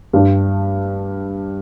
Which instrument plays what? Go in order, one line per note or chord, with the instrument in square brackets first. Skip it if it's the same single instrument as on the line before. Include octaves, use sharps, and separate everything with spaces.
[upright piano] G2 G3 D4 G4